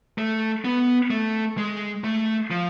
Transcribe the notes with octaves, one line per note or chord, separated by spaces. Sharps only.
A3
B3
A3
G#3
A3
F3